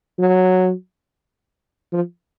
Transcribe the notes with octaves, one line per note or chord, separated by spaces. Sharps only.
F#3
F3